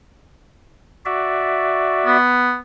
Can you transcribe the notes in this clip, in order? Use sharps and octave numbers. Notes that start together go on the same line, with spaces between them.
F#4 D5 E5
B3